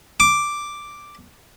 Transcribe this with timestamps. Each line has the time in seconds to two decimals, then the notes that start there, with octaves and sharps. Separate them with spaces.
0.20 D6